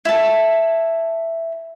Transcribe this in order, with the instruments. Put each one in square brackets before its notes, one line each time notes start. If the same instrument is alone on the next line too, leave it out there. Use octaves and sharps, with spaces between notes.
[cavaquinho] E4 A5